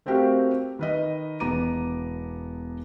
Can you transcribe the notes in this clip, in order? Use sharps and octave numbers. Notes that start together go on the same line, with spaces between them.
A3 C4 F#4 G4 A#4 F5
D#3 B4 D#5
E1 B3 A#5 D6 D#7